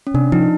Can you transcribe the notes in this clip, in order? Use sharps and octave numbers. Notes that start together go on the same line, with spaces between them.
C#4
C3 D4
F3 D#4